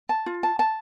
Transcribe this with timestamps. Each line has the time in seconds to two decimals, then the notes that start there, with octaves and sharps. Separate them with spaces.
0.09 A5
0.26 F4
0.43 A5
0.59 A5